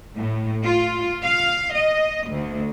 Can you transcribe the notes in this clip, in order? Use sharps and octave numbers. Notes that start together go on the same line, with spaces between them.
A2
F4
F5
D#5
D2